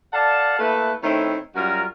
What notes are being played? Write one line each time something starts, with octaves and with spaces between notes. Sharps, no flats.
A4 D5 F5 F#5 A5
A3 A#3 E4 A4 B4
D#3 A3 C4 C#4 E4
F#2 G3 F4 F#4 A#4 A#5